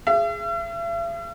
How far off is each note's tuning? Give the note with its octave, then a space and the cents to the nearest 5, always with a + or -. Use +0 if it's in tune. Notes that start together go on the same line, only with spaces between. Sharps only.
G#4 +0 E5 +45